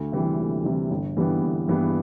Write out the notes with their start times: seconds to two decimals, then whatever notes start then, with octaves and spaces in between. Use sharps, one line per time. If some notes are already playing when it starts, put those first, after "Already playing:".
Already playing: D2
0.12 C3 E3 G3
0.39 D2
0.64 C3 E3 G3
0.90 G1
1.16 G2 E3 G3 B3
1.42 G1
1.68 G2 E3 G3 B3